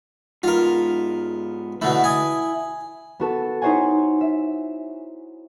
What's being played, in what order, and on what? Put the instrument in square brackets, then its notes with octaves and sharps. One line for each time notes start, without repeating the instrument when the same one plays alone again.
[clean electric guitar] G#2 B3 [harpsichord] F4 A#4
[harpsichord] B2 D3 A3 [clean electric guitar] E4
[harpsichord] G#5 D#6
[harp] B3 F#4 A4
D#4 E4 C5 C#5 F#5 G#5
E5